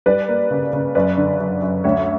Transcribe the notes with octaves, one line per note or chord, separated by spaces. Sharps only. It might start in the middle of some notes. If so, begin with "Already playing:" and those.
G3 B4 D5
A#3
C#3
C#3
F#2 B4 D5
D3
F#2
F#2
D2 C#5 E5